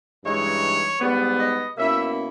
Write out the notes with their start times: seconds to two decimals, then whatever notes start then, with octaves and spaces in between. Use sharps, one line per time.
0.23 G2 E3 G#3 D#4 C#5
1.00 G#2 G3 B3
1.39 D#5
1.77 B2 A#3 C#4 E4 E5